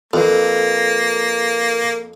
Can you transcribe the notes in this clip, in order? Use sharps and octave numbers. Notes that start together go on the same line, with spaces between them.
F2 A#3 F4 A4 B4